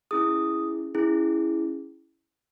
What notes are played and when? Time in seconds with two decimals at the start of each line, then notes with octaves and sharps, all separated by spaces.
0.11 C#4 E4 G#4 D#6
0.95 C#4 E4 G#4